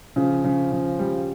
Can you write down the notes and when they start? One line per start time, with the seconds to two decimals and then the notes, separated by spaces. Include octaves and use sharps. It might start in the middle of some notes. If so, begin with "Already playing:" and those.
0.16 C#3 F3
0.44 C#3
0.72 C#3
0.99 G3